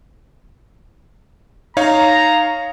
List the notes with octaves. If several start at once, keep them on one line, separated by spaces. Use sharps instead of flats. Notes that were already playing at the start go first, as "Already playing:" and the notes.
D#4 C#5 F5 A#5